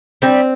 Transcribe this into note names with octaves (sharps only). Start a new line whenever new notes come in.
G3 C4